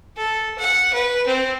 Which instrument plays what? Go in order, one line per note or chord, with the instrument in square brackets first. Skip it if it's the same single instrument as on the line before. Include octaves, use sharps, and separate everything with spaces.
[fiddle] A4
F#5
B4
C4